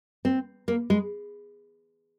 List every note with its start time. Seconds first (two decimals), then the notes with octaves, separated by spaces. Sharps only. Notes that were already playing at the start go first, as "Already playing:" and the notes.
0.25 C4
0.68 A#3
0.90 G#3